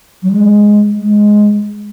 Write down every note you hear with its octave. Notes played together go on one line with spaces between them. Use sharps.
F#3
G#3
G#3